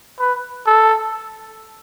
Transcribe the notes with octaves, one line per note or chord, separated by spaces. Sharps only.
B4
A4